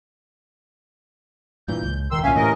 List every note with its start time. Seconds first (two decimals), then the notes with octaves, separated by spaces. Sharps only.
1.68 G2 A#2 E3 G6
1.83 C#2
2.11 E1 D2 D#3 C6 E6
2.24 C2 G2 A#2 C#4 E5 F5 G#5
2.36 A2 C3 E3 A#4 D#5